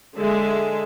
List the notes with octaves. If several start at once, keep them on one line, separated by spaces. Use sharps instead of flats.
D3 G#3 E5